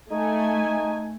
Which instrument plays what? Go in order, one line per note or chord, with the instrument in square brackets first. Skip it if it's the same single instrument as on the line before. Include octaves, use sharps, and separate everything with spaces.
[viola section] A3 G#5 [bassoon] D#4